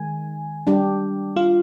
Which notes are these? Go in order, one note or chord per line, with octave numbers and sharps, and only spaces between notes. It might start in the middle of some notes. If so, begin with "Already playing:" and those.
Already playing: D#3 G#3 G#5
G3 D4 G4
F4 F5